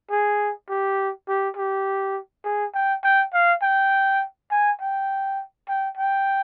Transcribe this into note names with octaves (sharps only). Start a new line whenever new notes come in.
G#4
G4
G4
G4
G#4
G5
G5
F5
G5
G#5
G5
G5
G5